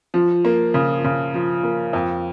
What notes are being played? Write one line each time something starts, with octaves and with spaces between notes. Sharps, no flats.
F3
A#3
C#3
C#3
F3
A#3
F2